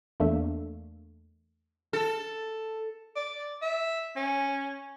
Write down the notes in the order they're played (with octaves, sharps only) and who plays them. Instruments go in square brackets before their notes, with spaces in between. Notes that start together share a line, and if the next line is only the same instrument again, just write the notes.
[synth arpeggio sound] E2 A3 A#3 D4 E5
[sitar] A4
[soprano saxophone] D5
E5
C#4